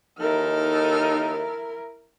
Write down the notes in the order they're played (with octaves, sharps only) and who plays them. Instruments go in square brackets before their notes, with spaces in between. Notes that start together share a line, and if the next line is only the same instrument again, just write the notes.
[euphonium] D#2 [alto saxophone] D#4 [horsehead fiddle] E4 A#4 [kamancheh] A4 F6